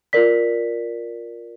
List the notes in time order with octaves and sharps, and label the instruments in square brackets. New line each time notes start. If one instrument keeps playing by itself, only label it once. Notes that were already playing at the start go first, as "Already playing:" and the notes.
[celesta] F4 A#4 D5 B6